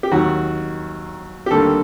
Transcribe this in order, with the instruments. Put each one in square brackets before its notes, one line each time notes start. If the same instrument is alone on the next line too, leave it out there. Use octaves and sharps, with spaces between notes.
[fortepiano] G4
D#2 D#3 F#3 F#4
G4
D#2 D3 G3 A#3 A4